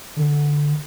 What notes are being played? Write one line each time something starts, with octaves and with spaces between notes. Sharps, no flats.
D3